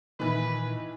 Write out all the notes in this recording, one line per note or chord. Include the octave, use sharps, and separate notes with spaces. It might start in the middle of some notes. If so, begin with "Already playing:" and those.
A#2 D#3 E3 E4 B4